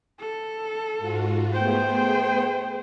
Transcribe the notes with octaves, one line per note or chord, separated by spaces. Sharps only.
A4
G#2 F4 F#4
A3 B3 G#4 C5 G5